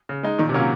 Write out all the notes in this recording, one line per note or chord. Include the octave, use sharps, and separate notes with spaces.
C#3
G#3 D#4
A#2 D#3
C3
A#2 F#3 A#3 C#4